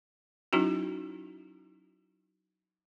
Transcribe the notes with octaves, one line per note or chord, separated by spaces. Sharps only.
F#3 C#4 D#4 E4 F#4